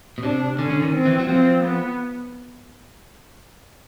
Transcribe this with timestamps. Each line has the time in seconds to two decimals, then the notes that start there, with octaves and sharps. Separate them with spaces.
0.18 B2
0.23 C3 D4
0.58 D3 C#4
0.71 D3
0.82 D#3
0.94 C4
1.05 E3
1.19 F#3
1.28 F3 C4
1.64 B3